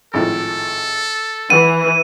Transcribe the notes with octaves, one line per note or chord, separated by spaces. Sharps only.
G#1 A2 F3 A4
E3 F#5 D#7